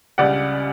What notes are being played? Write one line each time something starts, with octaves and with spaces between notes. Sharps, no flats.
C#2 C#3 G3 D5 F#5